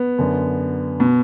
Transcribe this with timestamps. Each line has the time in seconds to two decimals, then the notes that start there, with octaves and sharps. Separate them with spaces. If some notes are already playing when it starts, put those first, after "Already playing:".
Already playing: B3
0.18 F#2 D3
1.00 B2